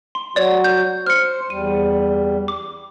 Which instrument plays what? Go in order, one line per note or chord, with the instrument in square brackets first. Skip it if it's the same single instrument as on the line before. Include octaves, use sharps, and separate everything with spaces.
[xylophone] C6
[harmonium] F#3 F#4 [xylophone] C#5 D5
[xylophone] G6
[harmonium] C5 [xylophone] F6 C#7
[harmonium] E2 G3 [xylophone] D#7
[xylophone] D6